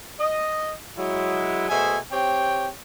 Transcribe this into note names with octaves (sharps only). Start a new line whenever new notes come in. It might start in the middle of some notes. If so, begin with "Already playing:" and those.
D#5
F#3 G#3 E4
B2 A3 G#4 C5 E5 G#5
C4 G4 C#5 G5